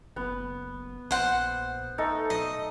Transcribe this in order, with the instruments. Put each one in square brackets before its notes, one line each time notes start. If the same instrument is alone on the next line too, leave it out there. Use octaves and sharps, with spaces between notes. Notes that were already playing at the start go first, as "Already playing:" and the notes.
[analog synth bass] F#1 [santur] B3
[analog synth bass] A#1 [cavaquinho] C5 F#5
[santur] A3 D#4 A4
[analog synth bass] B1 [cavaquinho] D#5